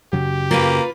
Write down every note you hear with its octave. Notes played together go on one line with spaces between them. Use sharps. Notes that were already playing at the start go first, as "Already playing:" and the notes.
F#2 C#3 F#3 G4
A#3 F4 B4